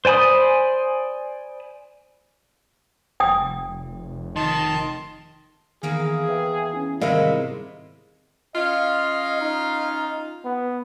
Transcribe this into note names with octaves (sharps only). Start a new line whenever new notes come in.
C5 D5 G#5 B5 D#6
F1 G5 D#6
D#3 D#5 A5 C6
E2 D#3 A#3 G#4 F5
B4 E5 G5
C#4 E4
G#2 C3 D#3 G3 E4 A#4 D#5 F5
C#4 F4 D#5
D#4
B3